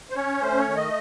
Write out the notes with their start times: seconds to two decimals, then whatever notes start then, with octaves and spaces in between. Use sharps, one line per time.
0.10 C5
0.15 C#4 C#5
0.41 A3 C5
0.59 C#5
0.67 D#3
0.76 D#5